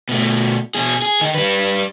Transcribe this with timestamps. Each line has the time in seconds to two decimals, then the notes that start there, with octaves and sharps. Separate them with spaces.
0.09 B2 A3
0.75 B2 G#4
1.02 G#4
1.21 D#3 D#4
1.35 G3 B4